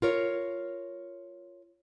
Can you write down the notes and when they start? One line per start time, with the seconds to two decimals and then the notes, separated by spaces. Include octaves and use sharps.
0.02 F4 A#4 C#5